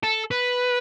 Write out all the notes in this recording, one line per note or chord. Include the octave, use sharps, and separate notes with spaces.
A4
B4